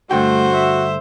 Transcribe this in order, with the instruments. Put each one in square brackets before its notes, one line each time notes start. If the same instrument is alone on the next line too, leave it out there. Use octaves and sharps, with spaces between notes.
[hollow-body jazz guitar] G2 D3 G5 [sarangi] A3 [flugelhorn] F#4 [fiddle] C5
[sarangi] E5